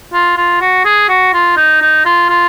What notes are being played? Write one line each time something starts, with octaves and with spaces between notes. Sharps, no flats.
F4
F4
F#4
G#4
F#4
F4
D#4
D#4
F4
F4